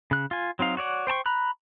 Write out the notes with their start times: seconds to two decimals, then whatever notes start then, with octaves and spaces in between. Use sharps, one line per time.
0.11 C#3 F#6
0.31 F4 G#5
0.59 F#3 C4 D#4 F5
0.77 F#4 C#5 D5 F#5
1.07 C5 G5 A5 C#6
1.26 A#5 B5 F#6